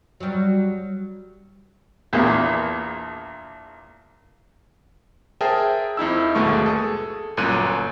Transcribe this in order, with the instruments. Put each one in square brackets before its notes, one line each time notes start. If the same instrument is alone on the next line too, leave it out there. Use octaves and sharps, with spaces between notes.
[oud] F#3 G3
[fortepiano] A#1 E2 A#3
[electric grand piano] G#4 A#4 C5 E5 G5 A5
F2 D#4 E4 E6
G1 D#2 B2 G#3 A3 C#6
G#4 A4
G1 F#2 A#2 F#6 D#7